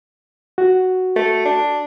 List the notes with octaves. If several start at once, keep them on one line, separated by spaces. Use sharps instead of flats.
F#4
A3
D4